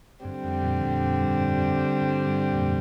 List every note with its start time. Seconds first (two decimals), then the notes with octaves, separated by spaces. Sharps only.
0.24 G2 D3 G3 C4
0.44 F2
0.63 F2 A#2
0.81 F2 A#2
1.01 F2
1.20 G2
1.58 F2
1.76 G2
2.01 G2
2.27 G2
2.52 F2 A#2